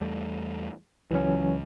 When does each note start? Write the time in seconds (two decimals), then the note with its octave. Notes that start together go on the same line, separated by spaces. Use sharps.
0.01 E2 G3 A3
1.11 C#2 E3 F#3 C#4